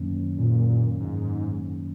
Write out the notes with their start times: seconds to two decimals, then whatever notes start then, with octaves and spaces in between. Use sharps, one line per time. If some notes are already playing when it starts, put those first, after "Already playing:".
Already playing: F#2 D#3 F#3 A#3 C#4
0.38 A#2
1.00 G#2